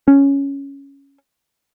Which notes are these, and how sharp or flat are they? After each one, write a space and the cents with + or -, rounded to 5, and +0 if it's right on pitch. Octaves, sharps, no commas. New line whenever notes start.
C#4 +0